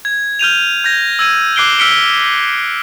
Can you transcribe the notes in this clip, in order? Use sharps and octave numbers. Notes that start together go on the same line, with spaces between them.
G#6
F6 G6 D#7 F7
G6 G#6 A#6
E6 G#6 D#7
D6 F#6 C7 D7 G7
E6 F6 B6 C#7 D7 G7